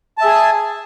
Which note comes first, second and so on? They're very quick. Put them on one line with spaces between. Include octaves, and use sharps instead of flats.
A5 E5 G#4 G#5